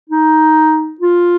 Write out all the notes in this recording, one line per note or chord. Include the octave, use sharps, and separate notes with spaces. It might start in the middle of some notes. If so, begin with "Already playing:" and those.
D#4
F4